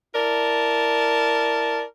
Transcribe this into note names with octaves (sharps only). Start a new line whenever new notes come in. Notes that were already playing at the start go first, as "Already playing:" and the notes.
E4 A#4 D5 A5